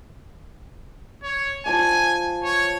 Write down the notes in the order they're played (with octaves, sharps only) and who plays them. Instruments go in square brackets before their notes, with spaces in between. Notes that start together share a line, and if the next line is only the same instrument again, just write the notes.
[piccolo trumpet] C#5
[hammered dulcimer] F3 A5 D6 [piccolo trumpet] G#5
[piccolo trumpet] C#5